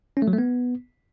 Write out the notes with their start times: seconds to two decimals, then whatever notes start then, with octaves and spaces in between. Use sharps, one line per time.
0.17 C#4
0.22 A3
0.28 F#3
0.33 A3
0.38 B3